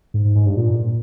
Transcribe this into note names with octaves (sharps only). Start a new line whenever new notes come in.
G#2
G#2
G#2
G2
A#2